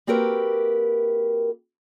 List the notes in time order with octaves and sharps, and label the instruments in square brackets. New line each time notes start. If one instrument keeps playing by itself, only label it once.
[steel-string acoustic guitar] A#3 C4 F#4 G4 A#4 B4